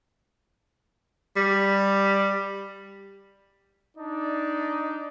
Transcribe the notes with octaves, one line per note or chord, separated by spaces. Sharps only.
G3
D4 D#4 D5